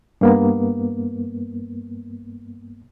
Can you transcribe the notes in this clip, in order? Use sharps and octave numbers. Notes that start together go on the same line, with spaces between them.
G2 A#3 B3